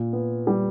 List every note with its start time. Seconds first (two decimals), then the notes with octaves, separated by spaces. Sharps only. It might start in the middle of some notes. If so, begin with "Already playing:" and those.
Already playing: A#2
0.13 B3
0.47 G3